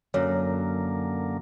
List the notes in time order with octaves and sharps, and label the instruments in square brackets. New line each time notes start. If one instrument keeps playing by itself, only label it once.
[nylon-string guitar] F#2 [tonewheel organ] D3 A#3 [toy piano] C#5